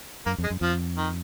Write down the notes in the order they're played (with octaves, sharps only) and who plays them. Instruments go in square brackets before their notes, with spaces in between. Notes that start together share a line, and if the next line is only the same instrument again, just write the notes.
[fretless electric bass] F#2 [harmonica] A#3
[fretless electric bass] F2
[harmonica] G#3
[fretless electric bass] F#2
[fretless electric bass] F2 [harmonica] F3
[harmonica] D#3